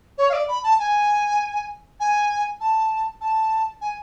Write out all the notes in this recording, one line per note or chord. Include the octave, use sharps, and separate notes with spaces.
C#5
F5
D5
B5
A5
G#5
G#5
A5
A5
G#5